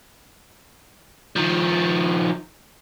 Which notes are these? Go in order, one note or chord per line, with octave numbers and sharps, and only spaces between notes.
D#3 F3